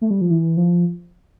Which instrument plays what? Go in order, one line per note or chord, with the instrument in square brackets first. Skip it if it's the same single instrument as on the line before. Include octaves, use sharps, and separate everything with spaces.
[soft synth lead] A3
G3
F3
E3
F3